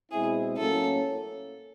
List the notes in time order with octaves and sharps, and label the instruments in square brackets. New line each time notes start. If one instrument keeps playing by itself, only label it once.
[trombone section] B2 G#3 C4 E4 [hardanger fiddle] G#4
[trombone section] A2 F#3 A#3 C#4 [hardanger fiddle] A4